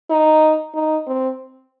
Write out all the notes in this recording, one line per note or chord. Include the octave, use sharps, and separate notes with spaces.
D#4
D#4
C4